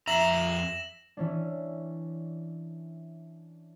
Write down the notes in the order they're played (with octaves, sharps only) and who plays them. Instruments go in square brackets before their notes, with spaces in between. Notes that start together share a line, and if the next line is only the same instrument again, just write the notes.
[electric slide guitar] F2 A#5 [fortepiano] E5 [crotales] A#6 E7 F#7
[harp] E3 C#4 D4